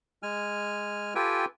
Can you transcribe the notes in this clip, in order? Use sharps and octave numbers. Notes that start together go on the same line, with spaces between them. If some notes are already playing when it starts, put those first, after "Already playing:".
G#3 G#5 F6
F4 G4 A4 B4 G5 G#5